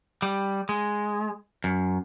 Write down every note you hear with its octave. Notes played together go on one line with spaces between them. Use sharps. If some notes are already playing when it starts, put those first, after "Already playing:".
G3
G#3
F#2